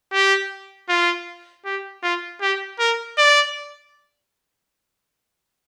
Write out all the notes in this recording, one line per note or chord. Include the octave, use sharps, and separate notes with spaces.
G4
F4
G4
F4
G4
A#4
D5